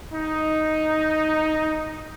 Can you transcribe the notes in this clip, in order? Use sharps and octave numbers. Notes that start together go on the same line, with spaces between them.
D#4